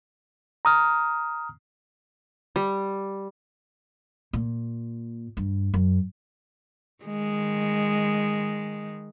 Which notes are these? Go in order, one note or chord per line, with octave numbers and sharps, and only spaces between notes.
A#5 D#6 F6
G3
A#2
G2
F#2
D#3 G#3